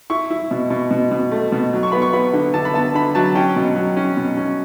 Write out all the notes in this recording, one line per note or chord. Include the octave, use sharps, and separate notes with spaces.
E4 C#6
E4
B2
B2
B2
B2
A3
B2
F#3
C#6
B3 B5
C#6
B3 B5
D3
D3 A5
B5
B3 A5
D3 B5
F#3 A5
C#4 G5
B2
F#3
C#4
B2
C#4